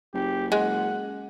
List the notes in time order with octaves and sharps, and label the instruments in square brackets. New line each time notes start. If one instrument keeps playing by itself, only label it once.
[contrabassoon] F#1 [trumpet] G4
[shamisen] G#3 [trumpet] F#5